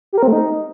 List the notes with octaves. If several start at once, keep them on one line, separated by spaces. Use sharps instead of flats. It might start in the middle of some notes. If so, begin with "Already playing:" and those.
G4
A#4
C4
A3
D#4